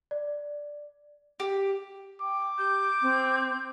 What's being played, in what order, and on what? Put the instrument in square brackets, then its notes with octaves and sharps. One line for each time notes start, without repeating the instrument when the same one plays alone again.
[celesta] D5
[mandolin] G4
[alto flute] G5 [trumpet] D6
[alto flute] G4 [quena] G6
[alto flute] C4